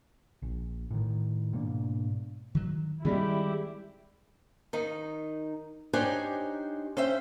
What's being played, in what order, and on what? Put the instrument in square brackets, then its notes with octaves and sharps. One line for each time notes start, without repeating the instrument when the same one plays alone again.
[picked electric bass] A#1
A2 D#3
G#2 B2 A#3 D4
[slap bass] D#3 F#3
[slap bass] D#3 C4 [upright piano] G3 G#3 [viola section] E4 G4
[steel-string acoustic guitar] D#3 D#4
D4 D#4 G4 C5 C#5 G#5
C#4 C5 E5 G5